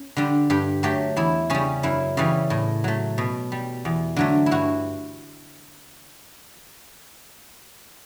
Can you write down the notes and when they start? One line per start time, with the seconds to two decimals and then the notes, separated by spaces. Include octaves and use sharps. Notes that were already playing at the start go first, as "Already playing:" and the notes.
Already playing: C#4
0.17 D3 G3
0.50 G2 G4
0.83 F#3 A3 G4
1.16 E2 E4
1.50 C#3 G3 C#4
1.83 F#2 E4
2.17 C#3 E3 G3
2.50 A2
2.84 F#3 A3
3.18 B2
3.52 G3
3.85 E2
4.16 D3 F#3 A3
4.46 E4
4.51 G2 F#4